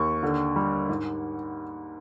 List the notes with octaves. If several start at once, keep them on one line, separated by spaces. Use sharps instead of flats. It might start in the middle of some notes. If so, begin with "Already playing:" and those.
Already playing: D#2 C#6
D3
G3
G#2